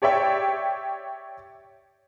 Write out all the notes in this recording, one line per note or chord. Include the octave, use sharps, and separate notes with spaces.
G4 C#5 D5 E5 G5